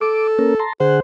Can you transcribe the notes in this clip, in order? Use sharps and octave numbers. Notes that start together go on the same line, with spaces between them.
A4 D6
A#3 C#4 A#4
A5 A#5 C6
D3 G#4 C5 F#5